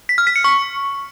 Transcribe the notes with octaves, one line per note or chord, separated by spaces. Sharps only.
B6
F6
B6
C#7
C#6